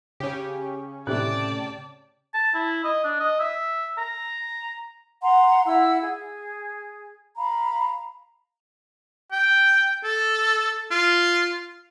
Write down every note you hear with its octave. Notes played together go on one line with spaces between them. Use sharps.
C#3 C#4 G4
A2 C3 D5 G5 A5 F#6
A5
E4
D#5
D4
D#5
E5
A#5
F#5 A#5 C6
E4 F5 F#5 E6
G#4
F5 A#5 B5
G5
A4
F4